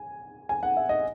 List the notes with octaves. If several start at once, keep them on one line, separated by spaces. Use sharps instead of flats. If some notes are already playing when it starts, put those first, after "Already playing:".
Already playing: G#5
G#5
F#5
E5
D#5